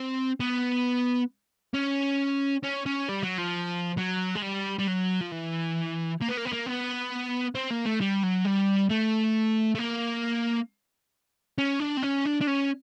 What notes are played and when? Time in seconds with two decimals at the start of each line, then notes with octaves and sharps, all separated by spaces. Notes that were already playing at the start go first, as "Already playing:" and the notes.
Already playing: C4
0.40 B3
1.74 C#4
2.64 C#4
2.86 C#4
3.09 G3
3.23 F#3
3.38 F3
3.98 F#3
4.36 G#3
4.42 G3
4.79 G3
4.88 F#3
5.21 F3
5.32 E3
6.21 A#3
6.29 B3
6.37 A#3
6.45 B3
6.52 A#3
6.66 B3
7.55 C4
7.71 A#3
7.85 A3
8.01 G3
8.23 F#3
8.44 G3
8.89 A3
9.75 A3
9.79 A#3
11.58 C#4
11.80 D4
11.97 C4
12.02 C#4
12.25 D4
12.41 D4
12.47 C#4